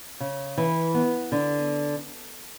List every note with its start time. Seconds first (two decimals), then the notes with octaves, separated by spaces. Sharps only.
0.20 C#3
0.58 E3
0.94 B3
1.32 D3